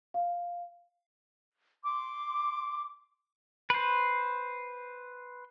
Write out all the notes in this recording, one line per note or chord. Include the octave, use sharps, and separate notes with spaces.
F5
C6 D6
B4 C5